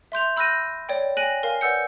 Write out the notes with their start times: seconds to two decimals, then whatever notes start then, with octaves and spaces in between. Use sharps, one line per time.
0.12 E5 C6 G6 F7
0.37 B5 E6 F#6 G6 A#6 D#7
0.89 C#5 D5 G5
1.17 G5 G#5 F#6 A#6 D#7 F#7
1.43 A#4 F5 G#5
1.61 B4 D5 F#5 E6 G6 C#7